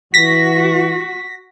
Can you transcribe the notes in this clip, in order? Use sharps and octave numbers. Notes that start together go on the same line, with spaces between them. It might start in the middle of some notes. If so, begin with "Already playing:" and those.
E3 F#4 A#6 B6